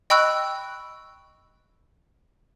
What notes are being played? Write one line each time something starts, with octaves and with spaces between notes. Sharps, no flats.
D#5 G5 B5 C#6 E6 F#6